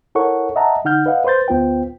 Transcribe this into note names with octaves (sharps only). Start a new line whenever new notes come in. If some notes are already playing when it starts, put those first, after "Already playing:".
E4 A4 A#4 C#5 F#5 C#6
D#5 E5 F#5 A5 A#5
D3 D#4 F#5 F6 G6
B4 D#5 F5 F#5
B4 C5 C6 G6 A6
D2 B3 F4 C5 G5